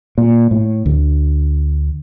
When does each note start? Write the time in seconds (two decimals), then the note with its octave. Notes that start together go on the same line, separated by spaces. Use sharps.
0.18 A#2
0.51 A2
0.86 D2